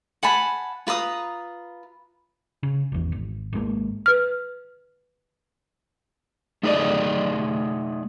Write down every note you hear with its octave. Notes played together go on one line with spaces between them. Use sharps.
F#5 G#5 A5 B5
F4 B4 A#5 D#6
C#3
G#1 E2
G#1
G#1 G#2 G#3 A#3
B4 F6
A3 D#4 G#4 B4 D5 D#5